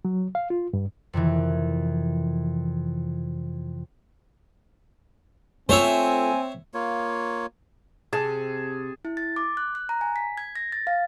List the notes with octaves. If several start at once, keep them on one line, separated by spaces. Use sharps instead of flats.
F#3
F5
F4
G2
F2 C3 D#3 E3
A3 C4 F4 C5 C#5 E5 G#5
A#3 F4 C#5
C3 G#4 A5
E4
A6
D6
F#6
F#6
A#5
G#5
B6
G#6
A#6
A6
F5